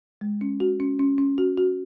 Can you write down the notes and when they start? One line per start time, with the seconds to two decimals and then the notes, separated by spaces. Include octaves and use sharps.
0.21 G#3
0.41 C#4
0.60 F#4
0.80 C#4
0.99 C#4
1.18 C#4
1.38 F#4
1.57 F#4